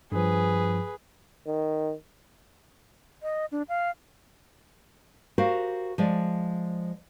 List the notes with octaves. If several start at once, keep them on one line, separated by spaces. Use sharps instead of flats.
G2 F3 G#4 B4
D#3
D#5
D4
F5
F#4 G4 A#4 C5 F5
F3 G#3 D5